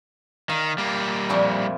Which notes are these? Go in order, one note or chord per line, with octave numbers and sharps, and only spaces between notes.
D#3 F5
G3 A#3
F2 A#2 E4